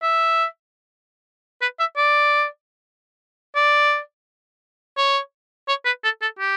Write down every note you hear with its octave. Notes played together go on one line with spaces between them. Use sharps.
E5
B4
E5
D5
D5
C#5
C#5
B4
A4
A4
G4